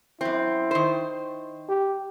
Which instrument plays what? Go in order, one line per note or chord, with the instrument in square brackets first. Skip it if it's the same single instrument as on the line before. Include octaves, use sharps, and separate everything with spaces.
[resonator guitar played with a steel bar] F#2 C4 [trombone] E4
[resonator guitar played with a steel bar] D#3 C5
[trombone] G4